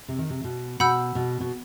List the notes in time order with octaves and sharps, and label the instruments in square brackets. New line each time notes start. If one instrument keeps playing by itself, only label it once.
[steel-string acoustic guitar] C3
D#3
C3
B2
[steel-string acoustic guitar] B2 [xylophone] F#5 B5 E6 G6
[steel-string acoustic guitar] B2
B2